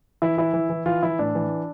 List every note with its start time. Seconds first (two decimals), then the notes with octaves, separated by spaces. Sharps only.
0.22 E3 E4
0.37 E3 E4
0.53 E3
0.70 E3
0.86 E3 F4
1.03 E3 E4
1.19 A2 D4
1.35 E3